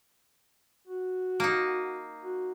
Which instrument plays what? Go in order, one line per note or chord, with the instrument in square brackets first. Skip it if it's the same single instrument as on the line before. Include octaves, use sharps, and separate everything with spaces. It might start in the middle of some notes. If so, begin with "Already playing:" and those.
[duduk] F#4
[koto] A#3 D#4
[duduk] F#4